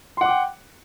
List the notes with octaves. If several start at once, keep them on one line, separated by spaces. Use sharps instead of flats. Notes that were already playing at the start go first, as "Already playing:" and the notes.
F#5 G5 C6 D6